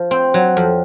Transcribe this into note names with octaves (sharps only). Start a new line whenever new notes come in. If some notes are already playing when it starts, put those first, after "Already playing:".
Already playing: F3
C4
F#3
F2